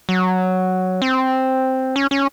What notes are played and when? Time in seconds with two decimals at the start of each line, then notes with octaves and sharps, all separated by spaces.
0.09 F#3
1.02 C4
1.96 C#4
2.11 C#4